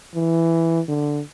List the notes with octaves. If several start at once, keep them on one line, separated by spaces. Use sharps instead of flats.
E3
D3